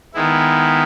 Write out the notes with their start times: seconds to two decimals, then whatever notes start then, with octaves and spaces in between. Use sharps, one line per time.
0.14 D#3 G#3 B3 E4